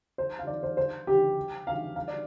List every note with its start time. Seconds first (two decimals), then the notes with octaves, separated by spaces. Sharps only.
0.18 C5
0.39 F5
0.47 D5
0.63 C5
0.77 C5
1.07 G4
1.67 F5
1.96 F5
2.08 D5